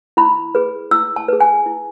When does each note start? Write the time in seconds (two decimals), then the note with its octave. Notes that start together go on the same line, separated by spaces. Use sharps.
0.17 E4 B5
0.55 G#4 B4
0.91 E4 E6
1.16 A5
1.28 G#4 B4
1.40 G#5
1.66 E4